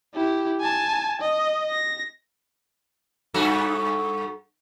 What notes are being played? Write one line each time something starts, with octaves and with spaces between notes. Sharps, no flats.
E4 G4
G#5 A5
D#5
A#6
G2 F#4 A4